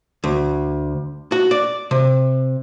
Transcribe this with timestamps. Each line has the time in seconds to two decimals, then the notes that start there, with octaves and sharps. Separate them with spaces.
0.24 D2
1.32 F#4
1.51 D5
1.91 C3